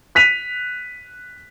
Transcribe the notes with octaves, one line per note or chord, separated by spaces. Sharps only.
F#6 B6 D#7 F7